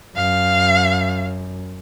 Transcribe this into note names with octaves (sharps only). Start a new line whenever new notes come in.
F#2 F5